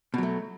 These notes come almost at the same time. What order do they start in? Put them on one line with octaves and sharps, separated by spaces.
B2 F#3 A3